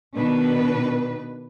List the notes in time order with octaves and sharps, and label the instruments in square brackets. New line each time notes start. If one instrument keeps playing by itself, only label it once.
[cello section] B2 D#3 D4 B4